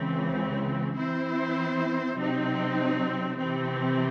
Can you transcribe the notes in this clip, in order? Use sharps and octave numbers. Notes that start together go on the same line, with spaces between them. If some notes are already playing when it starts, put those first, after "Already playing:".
Already playing: C#2 C#3 E3 C4
E3 C4 E4 C5
C3 F#3 C4 D#4
C3 E3 C4